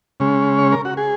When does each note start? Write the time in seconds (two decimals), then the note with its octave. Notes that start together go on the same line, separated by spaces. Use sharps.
0.20 C#3 G#3 C#4
0.59 C#5
0.72 A#4
0.85 F#4
0.97 G#4